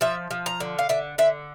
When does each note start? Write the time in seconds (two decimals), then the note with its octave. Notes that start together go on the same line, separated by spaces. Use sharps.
0.01 F3 E5
0.31 F3
0.46 A#5
0.60 D3
0.79 F5
0.89 D3 E5
1.18 D3 E5